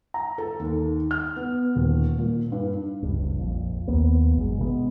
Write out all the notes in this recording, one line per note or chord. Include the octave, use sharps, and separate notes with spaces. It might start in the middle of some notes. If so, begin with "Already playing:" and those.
A#5
A4
D#2
F6
B3
D#1
A#2
G2
F#1 C#2 G2
A#1 F2
D#2 A#3 B3
G#1 F#2 D3 G#3
B2 G#3 A#3 B3